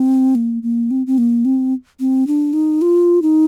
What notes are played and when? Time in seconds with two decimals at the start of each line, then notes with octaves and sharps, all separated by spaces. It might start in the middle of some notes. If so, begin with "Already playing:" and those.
Already playing: C4
0.35 A#3
0.63 A#3
0.91 C4
1.07 C4
1.18 A#3
1.45 C4
2.00 C4
2.27 D4
2.53 D#4
2.82 F4
3.22 D#4